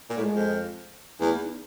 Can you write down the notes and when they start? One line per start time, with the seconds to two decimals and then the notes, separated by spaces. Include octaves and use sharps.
0.10 A#2
0.17 A2 G#3
0.34 F2
1.20 E2 A3
1.32 A#3
1.42 D#4